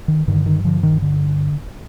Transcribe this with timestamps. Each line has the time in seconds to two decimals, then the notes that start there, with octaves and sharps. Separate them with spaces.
0.08 D#3
0.27 G2 D3 D#3
0.46 D#3
0.64 D3 F3
0.83 D#3
1.02 D3